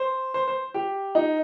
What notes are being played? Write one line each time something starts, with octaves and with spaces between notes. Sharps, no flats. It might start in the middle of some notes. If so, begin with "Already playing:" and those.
Already playing: C5
C5
C5
G4
D#4